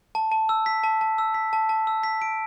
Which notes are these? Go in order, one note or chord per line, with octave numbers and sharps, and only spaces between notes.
A5
A5
E6
B6
A5
A5
E6
B6
A5
A5
E6
B6
D7